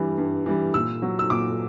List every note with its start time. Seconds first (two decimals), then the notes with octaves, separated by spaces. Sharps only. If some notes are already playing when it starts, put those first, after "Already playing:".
Already playing: G2 E3 G3
0.18 G2
0.46 E3 G3
0.74 A#2 E6
1.02 F#3
1.19 E6
1.30 A#2 D6